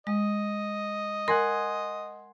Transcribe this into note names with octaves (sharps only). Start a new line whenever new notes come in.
G#3 D#5
A#4 F#5 G#5 C6